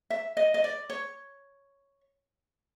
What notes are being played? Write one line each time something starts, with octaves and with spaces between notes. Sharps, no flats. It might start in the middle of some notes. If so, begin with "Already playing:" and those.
E5
D#5
D#5
D5
C#5